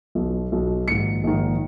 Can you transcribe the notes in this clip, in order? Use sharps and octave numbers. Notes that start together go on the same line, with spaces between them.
B1 B2
B1 B2
A#1 G#2 D#3 C#7
A#1 G#2 D#3